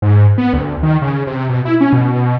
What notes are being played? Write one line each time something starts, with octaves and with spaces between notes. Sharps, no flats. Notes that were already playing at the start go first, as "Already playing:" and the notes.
G#2
B3
D2
D#3
C#3
C3
B2
E4
C#4
B2